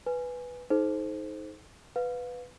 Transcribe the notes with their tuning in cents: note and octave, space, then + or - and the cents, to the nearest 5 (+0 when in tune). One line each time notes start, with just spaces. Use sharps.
B4 +0 G#5 +0
D#4 +20 A4 -45 C5 +0
B4 +5 F5 +30